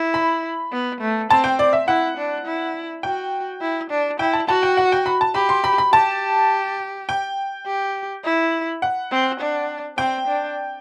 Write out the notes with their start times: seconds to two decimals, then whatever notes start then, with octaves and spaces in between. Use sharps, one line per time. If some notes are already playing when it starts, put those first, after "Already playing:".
Already playing: E4
0.14 B5
0.72 B3
1.01 A3
1.30 C4 A5
1.44 G5
1.59 D5
1.73 E5
1.87 E4 F#5
2.17 D4
2.46 E4
3.03 F#4 G5
3.61 E4
3.90 D4
4.19 E4 G5
4.33 A5
4.48 F#4 A5
4.63 G5
4.77 F#5
4.92 G5
5.06 B5
5.21 A5
5.34 G4 B5
5.49 C6
5.64 B5
5.78 B5
5.93 G4 A5
7.09 G5
7.66 G4
8.24 E4
8.82 F#5
9.11 C4
9.40 D4
9.98 C4 G5
10.27 D4